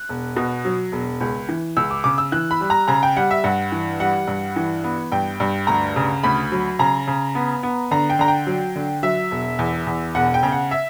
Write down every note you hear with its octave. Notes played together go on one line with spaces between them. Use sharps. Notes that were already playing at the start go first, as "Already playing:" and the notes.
Already playing: F#6
E1
B2
F#3
E1
C#2
E3
C#2 E6
D6
C#3 D6
E6
E3 F#6
B5
G3
A#5
C#3 A#5
G5
G3 F#5
E5
G2 F#5
E3
G3 F#5
G2
E3
B3
G2 G5
G2
D2 A#5
C#3
D2 B5
F#3
C#3 A#5
C#3
B3
B3
D3 A#5
G5
D3 A#5
G5
F#3
D3
F#3 E5
E1
E2
E2
E1 F#5
G5
C#3
F#5
E5